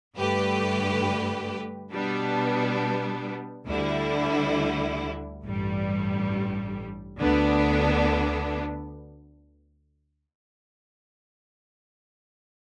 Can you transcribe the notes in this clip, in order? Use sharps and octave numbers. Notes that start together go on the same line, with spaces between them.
G2 D3 A3 G4 B4
B2 G3 B3 D4
D2 D3 G3 E4
A1 G2 G3
D2 D3 B3 D4